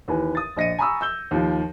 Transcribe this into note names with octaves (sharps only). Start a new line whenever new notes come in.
D#2 E3 B4 G#5
D#6 A6
A#1 D#5 A#6 C#7 D#7
G#5 A#5 B5 C#6 D#6 E6
E6 G6 G7
D#2 F3